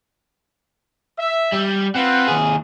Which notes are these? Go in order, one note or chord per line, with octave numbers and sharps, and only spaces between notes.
E5
G3
C4 F4 B4 F#5
D#2 G#4